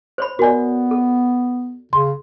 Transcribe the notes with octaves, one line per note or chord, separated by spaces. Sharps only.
C5 C#5 B5
B3 F#4 A#4 D5 G#5
A4
C#3 C6